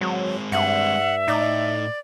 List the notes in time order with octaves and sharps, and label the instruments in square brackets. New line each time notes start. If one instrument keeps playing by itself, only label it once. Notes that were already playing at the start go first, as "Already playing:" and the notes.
[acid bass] F#3 [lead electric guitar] G#3 C4
[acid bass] G2 [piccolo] E5 [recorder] F#5
[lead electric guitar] A2 [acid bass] D#4 [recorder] D5